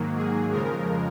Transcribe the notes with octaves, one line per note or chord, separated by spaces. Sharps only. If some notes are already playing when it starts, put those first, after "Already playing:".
Already playing: G#2 D#3 F#3 A#3
G#4
F2 C#3 F3 G#3 A#4